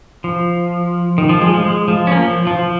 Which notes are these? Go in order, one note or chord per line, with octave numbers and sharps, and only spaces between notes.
F3
D#3
F3
G#3
F3
G#3
F3
C#4
A#3
F3
F3
F3